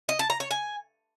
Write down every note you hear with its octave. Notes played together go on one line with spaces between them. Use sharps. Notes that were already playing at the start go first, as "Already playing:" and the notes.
D#5
A5
A#5
C#5
G#5